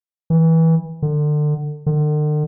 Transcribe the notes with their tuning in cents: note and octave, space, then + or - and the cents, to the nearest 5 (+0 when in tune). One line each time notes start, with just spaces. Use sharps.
E3 -20
D3 +30
D3 +45